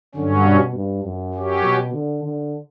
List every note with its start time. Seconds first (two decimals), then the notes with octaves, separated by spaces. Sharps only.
0.15 G2 D3 F#3 C#4
0.45 B2
0.74 G2
1.04 F#2
1.34 F#3 C#4 G4
1.64 B2
1.94 D3
2.23 D3